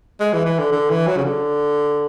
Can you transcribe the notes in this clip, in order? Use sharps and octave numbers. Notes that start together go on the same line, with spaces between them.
G#3
E3
E3
D3
D3
E3
F#3
C#3
D3